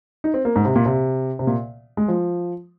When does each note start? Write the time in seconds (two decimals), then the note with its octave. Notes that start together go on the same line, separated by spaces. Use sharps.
0.24 D#4
0.34 C4
0.45 A#3
0.56 G#2
0.65 C3
0.75 A#2
0.86 C3
1.39 C3
1.47 A#2
1.97 G#3
2.08 F3